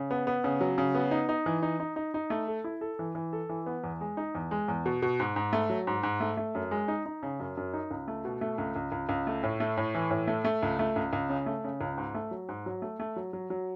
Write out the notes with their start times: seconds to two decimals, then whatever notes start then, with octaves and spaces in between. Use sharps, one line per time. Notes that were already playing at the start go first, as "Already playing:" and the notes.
Already playing: C#3
0.11 B3
0.27 B3
0.44 C#3
0.61 F#3
0.78 C#3
0.95 B3
1.11 D#4
1.29 D#4
1.46 E3
1.62 D#4
1.80 D#4
1.96 D#4
2.14 D#4
2.30 A3
2.48 A4
2.64 E4
2.81 A4
2.99 E3
3.15 E3
3.33 A4
3.49 E3
3.66 B3
3.84 E2
4.01 G#3
4.17 D#4
4.35 E2
4.51 G#3
4.68 E2
4.86 B2
5.02 B2
5.20 G#2
5.36 G#2
5.53 A3
5.70 F#3
5.87 G#2
6.03 G#2
6.20 A3
6.37 A3
6.55 F#2
6.71 G#3
6.88 D#4
7.06 D#4
7.23 C#3
7.40 F#2
7.57 F#2
7.74 D#4
7.91 C#2
8.08 A3
8.25 B2
8.41 A3
8.58 C#2
8.76 C#2
8.92 C#2
9.09 C#2
9.27 A3
9.43 A2
9.60 A3
9.77 A2
9.95 E3
10.11 A2
10.27 A3
10.45 A3
10.63 C#2
10.79 A3
10.96 C#2
11.13 C#2
11.30 C#3
11.46 A3
11.64 C#3
11.81 C#2
11.98 G#2
12.15 A3
12.31 F#3
12.49 G#2
12.66 F#3
12.82 A3
13.00 A3
13.16 F#3
13.33 F#3
13.50 F#3